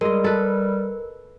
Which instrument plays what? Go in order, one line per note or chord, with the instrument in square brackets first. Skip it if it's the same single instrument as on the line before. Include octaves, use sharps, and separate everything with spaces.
[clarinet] G3 [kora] G#3 D#5 [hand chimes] A#4
[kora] A4 B4